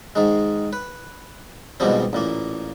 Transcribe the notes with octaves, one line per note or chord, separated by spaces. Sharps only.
G#2 D#3 G#3
B4
G#2 B2 D#3 F3 G3 C4
A1 A#2 A#3